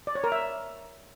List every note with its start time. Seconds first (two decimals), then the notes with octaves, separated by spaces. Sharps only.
0.07 D5
0.15 C#5
0.24 A#4
0.32 E5